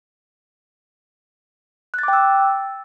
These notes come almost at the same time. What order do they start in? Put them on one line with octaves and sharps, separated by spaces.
F#6 A6 D6 G5 E6